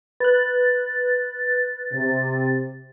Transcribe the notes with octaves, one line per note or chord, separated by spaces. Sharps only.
B4 F#6 A6
C3